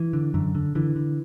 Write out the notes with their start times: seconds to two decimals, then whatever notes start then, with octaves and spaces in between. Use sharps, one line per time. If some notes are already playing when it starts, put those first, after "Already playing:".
Already playing: E3
0.13 D3
0.34 F#2 D3
0.55 D3
0.75 D3 E3
0.96 D3